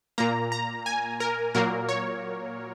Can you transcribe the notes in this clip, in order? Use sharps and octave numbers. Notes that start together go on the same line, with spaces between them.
A#2 A#3 A#5
A#5
G#5
A#4
A#2 F#3 A#3 A#4
C#5